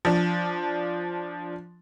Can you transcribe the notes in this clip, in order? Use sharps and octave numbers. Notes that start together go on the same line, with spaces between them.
F3 D4